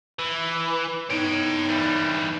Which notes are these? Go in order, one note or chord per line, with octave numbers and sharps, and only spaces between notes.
E3
B3 D#4 C#5 G5
E3 G3